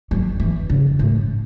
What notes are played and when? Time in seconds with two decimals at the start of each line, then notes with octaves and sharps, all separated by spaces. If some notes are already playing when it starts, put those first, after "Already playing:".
0.11 F#3
0.40 E3
0.70 C#3
0.99 A2